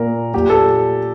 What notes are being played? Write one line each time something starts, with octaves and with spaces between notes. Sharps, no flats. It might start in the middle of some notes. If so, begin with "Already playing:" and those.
Already playing: A#2 A#4
A#2 G4
A4